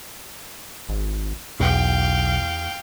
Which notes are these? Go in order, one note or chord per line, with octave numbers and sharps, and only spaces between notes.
G#1
B1 E2 F5 G5